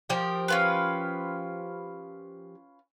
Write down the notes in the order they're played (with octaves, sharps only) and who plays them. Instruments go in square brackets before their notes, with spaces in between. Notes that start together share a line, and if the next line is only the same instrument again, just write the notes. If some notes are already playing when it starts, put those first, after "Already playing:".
[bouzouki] F3 G4 A#4
[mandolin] C#4 F4 B4